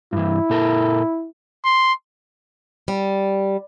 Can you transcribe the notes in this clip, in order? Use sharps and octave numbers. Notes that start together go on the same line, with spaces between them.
G2 E3 E4
A#2 A4 A#4
C6
G3